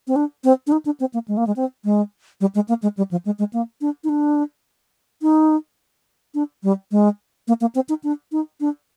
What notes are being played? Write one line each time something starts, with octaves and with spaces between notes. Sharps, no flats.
C4
D4
C4
D4
D#4
D4
C4
A#3
G#3
A#3
G#3
C4
G#3
G3
G#3
A#3
G#3
G3
F3
G#3
G#3
A#3
D4
D#4
D4
D#4
D4
G3
G#3
A#3
A#3
C4
D#4
D4
D#4
D4